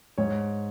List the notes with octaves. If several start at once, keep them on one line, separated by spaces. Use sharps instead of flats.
G#2 C#5